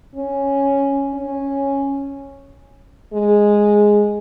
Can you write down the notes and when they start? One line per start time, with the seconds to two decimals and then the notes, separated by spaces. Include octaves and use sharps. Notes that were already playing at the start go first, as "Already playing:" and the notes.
0.15 C#4
1.14 C#4
3.13 G#3